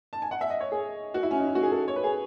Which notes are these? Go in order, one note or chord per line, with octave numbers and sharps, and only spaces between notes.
A5
G#5
F#5
E5
D#5
C#5
G#4
F#4
E4
C#4
D#4
E4
F#4
G#4
A4
C#5
B4
G#4